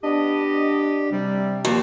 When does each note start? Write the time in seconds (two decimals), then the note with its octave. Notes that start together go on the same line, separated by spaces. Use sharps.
0.03 B3 D4 G4 D#5
1.12 C3 G3
1.65 D#2 F3